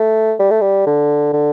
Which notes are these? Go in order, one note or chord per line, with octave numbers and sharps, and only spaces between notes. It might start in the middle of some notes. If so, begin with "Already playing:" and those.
Already playing: A3
G3
A3
G3
D3
D3